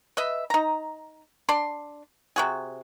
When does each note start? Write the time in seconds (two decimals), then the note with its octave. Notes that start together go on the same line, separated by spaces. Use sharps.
0.17 B4 D#5 E5
0.50 D#4 A#5
1.49 D4 D5 C6
2.36 C3 F#4 G#4